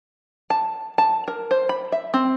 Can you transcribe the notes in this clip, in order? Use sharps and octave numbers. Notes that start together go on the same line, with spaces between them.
A5
A5
A#4
C5
B5
E5
C4